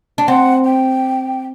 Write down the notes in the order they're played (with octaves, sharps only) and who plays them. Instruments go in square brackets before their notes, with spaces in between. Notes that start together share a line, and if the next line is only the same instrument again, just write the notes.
[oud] D4
[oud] C4 [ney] F#5
[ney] G5